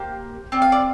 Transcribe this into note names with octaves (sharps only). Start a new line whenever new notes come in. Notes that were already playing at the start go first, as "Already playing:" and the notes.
Already playing: A#3 G4 C5
C4 F4 D5
F5
D5